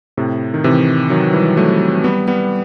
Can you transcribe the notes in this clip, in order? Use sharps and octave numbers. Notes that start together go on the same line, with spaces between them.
A2 C3
D#3
C3 E3
D#3 F#3
E3 G3
F#3 A3
G3 B3
G3 B3